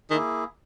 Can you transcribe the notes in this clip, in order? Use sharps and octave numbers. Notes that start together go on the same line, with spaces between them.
D#3 A#3 E4 G#4